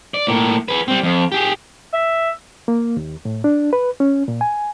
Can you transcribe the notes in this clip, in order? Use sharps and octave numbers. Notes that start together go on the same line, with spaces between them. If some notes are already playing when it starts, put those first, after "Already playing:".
D5
A2 A#3
G#4 B4
G3 C4
F2
G4 G#4
E5
A#3
D#2
A2
D4
B4
C#4
A#2
G#5